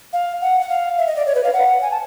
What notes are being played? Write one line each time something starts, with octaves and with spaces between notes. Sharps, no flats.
F5
F#5
F#5
F5
E5
D#5
D5
C#5
B4
F5
F#5
G#5
A5